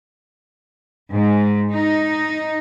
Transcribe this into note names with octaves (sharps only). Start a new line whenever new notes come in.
G#2
D#4